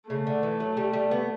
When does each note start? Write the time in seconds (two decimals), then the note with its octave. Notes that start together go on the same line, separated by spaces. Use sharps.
0.10 C#3 A3
0.27 D3
0.43 E3
0.60 F#3
0.77 G3
0.93 G3
1.11 B3